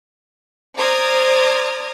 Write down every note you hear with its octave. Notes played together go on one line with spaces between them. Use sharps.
C5 D5 A#5 D#6 F6 G#6